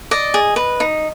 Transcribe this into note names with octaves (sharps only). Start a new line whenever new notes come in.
D5 D#5
G#4
B4
D#4